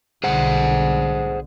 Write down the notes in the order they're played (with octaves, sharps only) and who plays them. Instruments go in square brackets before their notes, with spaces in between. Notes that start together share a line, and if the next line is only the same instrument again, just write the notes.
[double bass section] B1 D3 [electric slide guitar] G#4 C5 F#5